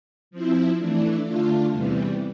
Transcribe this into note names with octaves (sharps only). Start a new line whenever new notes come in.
F3 C4 E4
E3 A3 D4
D3 A3 D4 F4
E2 C3 E3 G3